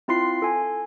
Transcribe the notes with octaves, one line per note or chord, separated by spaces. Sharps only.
C4 E4 F4 C6 C7
A4 G#5